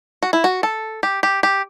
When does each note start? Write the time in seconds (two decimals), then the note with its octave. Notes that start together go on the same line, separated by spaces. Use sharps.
0.23 F#4
0.33 E4
0.44 F#4
0.63 A4
1.03 G4
1.23 G4
1.43 G4